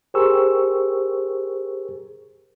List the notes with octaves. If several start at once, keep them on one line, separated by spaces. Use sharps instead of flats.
G4 G#4 A#4 C5 C#6 E6